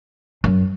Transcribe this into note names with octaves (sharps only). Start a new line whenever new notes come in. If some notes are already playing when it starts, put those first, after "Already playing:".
F#2